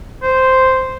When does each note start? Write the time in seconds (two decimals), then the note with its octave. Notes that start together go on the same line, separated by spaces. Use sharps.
0.23 C5